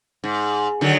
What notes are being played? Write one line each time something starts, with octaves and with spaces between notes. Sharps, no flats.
G#2
D3 D#3 F#3